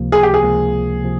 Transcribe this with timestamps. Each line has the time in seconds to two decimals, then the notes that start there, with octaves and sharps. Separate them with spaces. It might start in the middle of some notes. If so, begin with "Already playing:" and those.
Already playing: C#2 C3 F3 A#3
0.12 G#4
0.23 G4
0.34 G#4
0.43 C#2 C3 F3 A#3
1.03 C3 F3